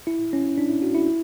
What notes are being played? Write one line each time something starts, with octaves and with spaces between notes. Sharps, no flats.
E4
C#4
D4
E4
F#4
E4